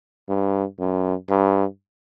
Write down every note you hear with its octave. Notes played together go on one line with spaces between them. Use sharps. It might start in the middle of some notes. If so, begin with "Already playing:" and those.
G2
F#2
G2